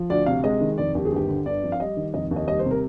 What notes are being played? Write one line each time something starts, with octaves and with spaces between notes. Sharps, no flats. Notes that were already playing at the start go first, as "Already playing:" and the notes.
Already playing: F3
D2 D5
C3 F5
G#3 D#5
D#3
F1 D5
D#2 G4
G#4
G1 G4
D3
G1 D5
F2
F5
G3 D#5
D#3
F1 D#5
D#2
D#5
G3 D#5
C5
C3
A#4